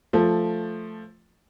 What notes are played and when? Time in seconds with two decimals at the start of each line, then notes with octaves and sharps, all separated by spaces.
0.13 F3 A3